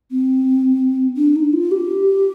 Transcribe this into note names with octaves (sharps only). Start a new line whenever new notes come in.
C4
D4
D#4
F4
G4